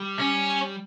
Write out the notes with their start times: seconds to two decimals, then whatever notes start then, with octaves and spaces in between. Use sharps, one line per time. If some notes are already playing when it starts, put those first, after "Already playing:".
Already playing: G3
0.19 C#4